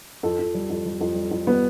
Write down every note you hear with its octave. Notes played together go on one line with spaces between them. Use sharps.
F2 A4
F2
G3
F2
G3
F2
G3
F2
G3 B3